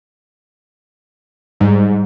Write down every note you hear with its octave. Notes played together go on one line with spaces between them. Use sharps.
G#2 G3